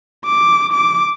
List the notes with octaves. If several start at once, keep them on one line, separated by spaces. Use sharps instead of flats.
D6
D6